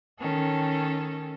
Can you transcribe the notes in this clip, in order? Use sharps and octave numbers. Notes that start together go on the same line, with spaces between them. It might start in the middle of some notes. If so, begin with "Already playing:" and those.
D#3 C#4 A4